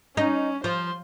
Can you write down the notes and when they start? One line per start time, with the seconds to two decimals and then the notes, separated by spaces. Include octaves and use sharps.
0.17 C#4 D#4
0.64 F3 C5 C6